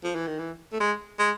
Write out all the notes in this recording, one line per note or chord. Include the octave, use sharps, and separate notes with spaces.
F3
E3
D#3
E3
A3
G#3
G#3